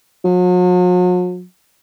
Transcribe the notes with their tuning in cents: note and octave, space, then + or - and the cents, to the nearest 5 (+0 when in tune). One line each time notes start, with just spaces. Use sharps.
F#3 -45